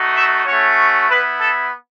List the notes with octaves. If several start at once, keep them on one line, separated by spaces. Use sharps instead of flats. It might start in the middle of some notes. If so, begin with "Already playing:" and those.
Already playing: A3 D#4 F#4
E5
A3 C#4 F#4 C#5
B3 E4 B4
A4